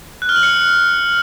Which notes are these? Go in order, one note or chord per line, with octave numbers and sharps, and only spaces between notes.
F#6
F6
F#7
C#7